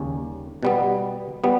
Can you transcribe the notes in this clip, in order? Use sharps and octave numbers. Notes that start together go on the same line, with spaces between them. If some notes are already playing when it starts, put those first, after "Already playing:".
Already playing: D#2 C#3 G3 C#4
B2 G3 B3
G3 B3